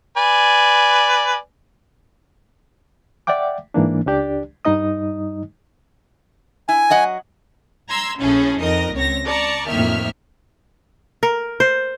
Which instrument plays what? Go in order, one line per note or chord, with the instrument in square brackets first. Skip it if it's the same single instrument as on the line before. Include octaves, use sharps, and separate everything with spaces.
[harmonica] B4 D5 G#5
[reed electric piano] D5 E5 F#5 G5 D6
G#2 E3 A#3 D4
C#2 D4 G4 D5
G2 G3 D#4 D#5 D#6
[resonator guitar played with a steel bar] E4 [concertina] G#5
[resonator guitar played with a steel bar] F#3 D#5 F#5
[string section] A#5 C6 E6 G#6
A#1 A2 C#4 G#4 A4
F2 D#4 A#4 D#5 A#6
C#2 C4 C#5 A#6
D5 A5 A#5 C#6
F2 A2 D#3 A#3 E5 F6
[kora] A#4
C5